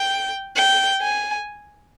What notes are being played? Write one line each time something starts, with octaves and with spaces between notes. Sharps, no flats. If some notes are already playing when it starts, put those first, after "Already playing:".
Already playing: G5
G5
G#5